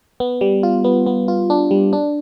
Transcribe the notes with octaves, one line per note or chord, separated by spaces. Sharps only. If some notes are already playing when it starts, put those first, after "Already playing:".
B3
G3
F4
B3
B3
F4
D4
G3
D4